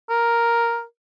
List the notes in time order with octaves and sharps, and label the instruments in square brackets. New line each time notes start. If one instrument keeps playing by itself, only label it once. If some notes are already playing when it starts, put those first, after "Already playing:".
[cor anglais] A#4